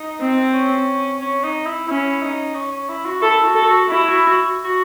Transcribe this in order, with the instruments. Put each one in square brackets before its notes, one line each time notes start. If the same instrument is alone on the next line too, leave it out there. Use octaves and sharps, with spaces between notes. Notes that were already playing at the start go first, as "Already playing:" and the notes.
Already playing: [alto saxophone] D#4
[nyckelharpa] C4
[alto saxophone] C#4
C#4
D#4
E4
[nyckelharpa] C#4 [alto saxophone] E4
[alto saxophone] D#4
C#4
C#4
E4
F#4
[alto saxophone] E4 [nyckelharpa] A4
[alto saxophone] F#4
[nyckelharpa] A4
[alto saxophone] F#4
[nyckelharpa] E4 [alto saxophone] F#4
[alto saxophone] F#4
F#4
F#4
F#4